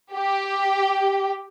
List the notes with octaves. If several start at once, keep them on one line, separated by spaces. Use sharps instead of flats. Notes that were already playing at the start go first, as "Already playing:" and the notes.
G4